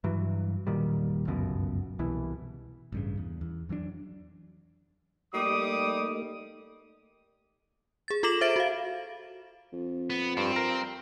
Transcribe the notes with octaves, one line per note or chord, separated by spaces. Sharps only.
G2 E3 F#3
E1 A#2 D#3 G3
G1 C#2 F#2 B2
C2 B2 E3
A1 G2 C#3
E2
E2
F2 E3 F#3 D4
G3 A3 A#3 D#4 D6 D#6
G#4 A6
F4 A4 D6 A#6 E7 F#7
C5 E5 A6 D7
F#4 F5
F2
B3
G2 C4
A#4